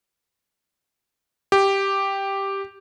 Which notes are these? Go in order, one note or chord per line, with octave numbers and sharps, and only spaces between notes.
G4